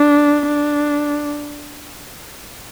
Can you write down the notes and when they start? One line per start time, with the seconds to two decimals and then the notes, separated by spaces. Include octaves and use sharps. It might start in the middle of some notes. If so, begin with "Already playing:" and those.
Already playing: D4
0.47 D4